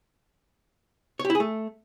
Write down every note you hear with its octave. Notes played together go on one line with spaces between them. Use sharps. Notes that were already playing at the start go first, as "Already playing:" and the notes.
C#5
G4
E4
G#4
A3